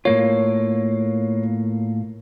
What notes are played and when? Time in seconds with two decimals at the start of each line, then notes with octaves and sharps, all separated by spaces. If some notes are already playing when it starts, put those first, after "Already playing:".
0.05 A2 A#3 F4 C#5